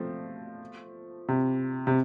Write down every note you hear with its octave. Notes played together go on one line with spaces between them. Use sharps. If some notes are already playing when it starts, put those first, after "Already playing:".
Already playing: F3 A3 C4
C3
C3